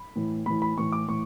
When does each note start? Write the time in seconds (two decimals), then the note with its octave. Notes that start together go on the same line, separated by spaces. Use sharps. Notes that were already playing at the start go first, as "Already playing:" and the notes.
Already playing: B5
0.16 A2 E3
0.46 A2 E3 B5
0.62 B5
0.78 A2 E3 C#6
0.92 D6
1.08 A2 E3 C#6